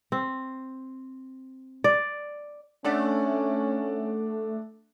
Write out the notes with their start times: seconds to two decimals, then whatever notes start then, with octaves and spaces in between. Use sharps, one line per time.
0.12 C4
1.84 D5
2.84 A3 C#4 D4 D5 F#5